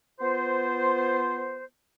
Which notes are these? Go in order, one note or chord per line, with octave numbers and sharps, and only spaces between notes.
B3 F4 C5